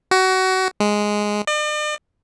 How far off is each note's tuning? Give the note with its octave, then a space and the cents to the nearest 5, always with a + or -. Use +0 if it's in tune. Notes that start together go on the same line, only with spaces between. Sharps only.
F#4 +25
G#3 +0
D5 +45